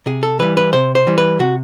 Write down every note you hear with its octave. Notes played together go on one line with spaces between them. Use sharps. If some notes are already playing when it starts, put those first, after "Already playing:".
C3 G#4
A4
E3 G3 B4
B4
C3 C5
C5
E3 G3
B4
C3 F#4